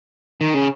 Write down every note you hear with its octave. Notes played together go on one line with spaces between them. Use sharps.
D#3
C#3